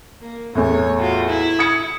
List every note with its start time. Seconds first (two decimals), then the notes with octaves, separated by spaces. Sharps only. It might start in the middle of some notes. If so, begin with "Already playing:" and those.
0.21 A#3
0.55 E2 A2 C#5
0.99 F4 F#4
1.28 E4
1.59 D#6 G#6 C#7